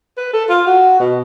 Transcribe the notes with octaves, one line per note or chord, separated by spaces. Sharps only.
B4
A4
F4
F#4
B2